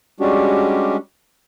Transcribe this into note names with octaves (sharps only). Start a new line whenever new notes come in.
G3 G#3 C#4 D4 F#4 G4